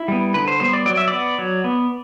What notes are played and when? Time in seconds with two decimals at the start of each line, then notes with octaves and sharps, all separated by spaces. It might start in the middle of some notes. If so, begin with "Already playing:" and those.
Already playing: E4
0.08 G3 B3
0.34 D3 B4
0.48 C5
0.60 G3 B3 C5
0.73 D5
0.86 F#3 D5
0.97 E5
1.08 B3 D5
1.39 F#3
1.64 B3